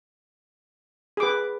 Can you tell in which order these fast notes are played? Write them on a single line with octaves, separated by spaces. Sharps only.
G#4 D6 B4